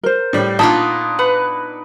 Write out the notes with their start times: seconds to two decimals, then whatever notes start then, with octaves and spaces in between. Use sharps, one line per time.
0.03 A#4 C5
0.33 A2 G3
0.59 A#2 B3 D4 D#4 F4 A5
1.19 B4 F#5